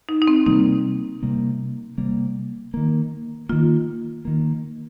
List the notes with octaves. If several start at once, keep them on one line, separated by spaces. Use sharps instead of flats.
D#4
D#4
C4
C3 G3 A#3 D#4
C3 G3 A#3
C3 G3 A#3
D#3 A#3
D#3 A#3 F4
D#3 A#3